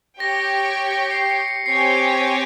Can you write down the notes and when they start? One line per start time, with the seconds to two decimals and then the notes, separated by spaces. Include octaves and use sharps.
0.20 G4 C#5 G5 A#6
0.92 A#6
1.11 C7
1.30 C#7
1.48 C#7
1.66 C4 G4 C#5 G#5 C7